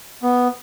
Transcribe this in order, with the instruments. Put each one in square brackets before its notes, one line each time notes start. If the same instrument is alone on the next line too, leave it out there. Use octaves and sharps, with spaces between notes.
[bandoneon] B3